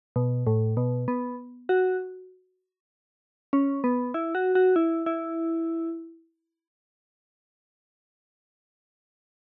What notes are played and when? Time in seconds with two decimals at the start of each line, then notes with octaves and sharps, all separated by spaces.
0.16 B2
0.47 A2
0.77 B2
1.08 B3
1.69 F#4
3.53 C#4
3.84 B3
4.14 E4
4.35 F#4
4.55 F#4
4.76 E4
5.06 E4